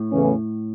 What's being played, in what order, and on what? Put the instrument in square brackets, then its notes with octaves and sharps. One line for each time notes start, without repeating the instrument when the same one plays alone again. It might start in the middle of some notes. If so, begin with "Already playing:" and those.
Already playing: [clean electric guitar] A2
[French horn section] E2 C#3 E3 A3 C#4